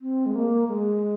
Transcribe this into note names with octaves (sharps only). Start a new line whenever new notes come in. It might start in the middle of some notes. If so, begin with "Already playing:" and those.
C4
G#3
A#3
G#3